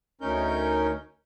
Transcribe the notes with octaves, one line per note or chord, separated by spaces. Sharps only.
D2 C#4 D#4 A#4 G6